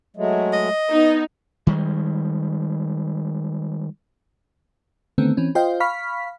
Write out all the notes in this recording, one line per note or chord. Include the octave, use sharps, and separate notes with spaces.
F#3 G#3 A3
D#5
B3 D#4
D#3 G3 G#3
D3 D#3 A3 B3 C4
E3 C4 C#4
F4 C5 D#5 F5 G5
F5 B5 C#6 F6 B6